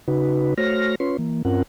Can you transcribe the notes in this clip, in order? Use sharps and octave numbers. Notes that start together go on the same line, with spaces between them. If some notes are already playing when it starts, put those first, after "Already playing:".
C#3 D#4 F#4 B4
A3 F#4 C5 C#5 F6 A#6
C#4 F4 B4 C#5 C6
E3 A#3
G2 C4 C#4 F4 A#4 F#5